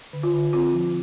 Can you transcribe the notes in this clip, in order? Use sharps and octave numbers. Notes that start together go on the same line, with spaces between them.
D3
F4
D3
C4 F4
F3